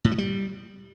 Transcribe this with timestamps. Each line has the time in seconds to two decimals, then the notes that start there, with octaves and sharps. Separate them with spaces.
0.04 A2
0.11 F#3
0.18 G3